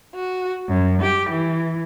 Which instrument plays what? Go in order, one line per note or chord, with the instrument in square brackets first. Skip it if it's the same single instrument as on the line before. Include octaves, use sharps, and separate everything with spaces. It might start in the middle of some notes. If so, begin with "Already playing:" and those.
[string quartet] F#4
F#2
G4
E3